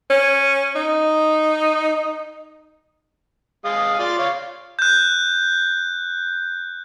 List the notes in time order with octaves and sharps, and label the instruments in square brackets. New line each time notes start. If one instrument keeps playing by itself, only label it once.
[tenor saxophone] C#4
D#4
[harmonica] G#3 F5 D#6
F4 D5
C#5 F5
[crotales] F#6 G6